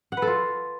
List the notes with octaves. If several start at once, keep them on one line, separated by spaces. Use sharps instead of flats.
F#5
B4
A4
F4